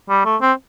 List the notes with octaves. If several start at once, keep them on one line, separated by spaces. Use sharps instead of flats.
G3
A3
C4